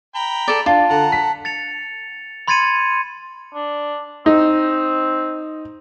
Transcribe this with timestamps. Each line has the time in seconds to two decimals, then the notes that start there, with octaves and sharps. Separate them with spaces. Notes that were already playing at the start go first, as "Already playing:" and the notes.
0.15 G5 A#5 B5
0.48 A4 D5
0.66 D4 F4 A5
0.90 D3 F#5 A#5
1.12 B6
1.45 A6 C#7 F7
2.48 B5 C6 G#6 A6 C#7 D#7
3.54 D4
4.26 C4 D#4